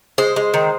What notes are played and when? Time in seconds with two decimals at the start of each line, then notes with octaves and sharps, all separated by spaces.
0.18 G#3 C5
0.36 G#3
0.54 D#3